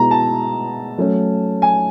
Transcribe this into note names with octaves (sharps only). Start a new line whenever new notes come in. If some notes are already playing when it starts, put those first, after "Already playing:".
Already playing: B2 G#3 B3 E4 A#5
A5
F#3 A3 C#4
G#5